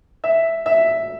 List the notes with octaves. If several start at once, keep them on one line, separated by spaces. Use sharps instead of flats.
E5
E5